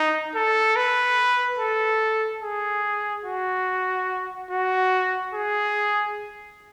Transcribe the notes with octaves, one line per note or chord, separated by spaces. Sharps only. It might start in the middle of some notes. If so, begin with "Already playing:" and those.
Already playing: D#4
A4
B4
A4
G#4
F#4
F#4
G#4